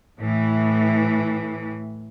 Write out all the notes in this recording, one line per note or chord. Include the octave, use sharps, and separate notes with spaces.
A2 E3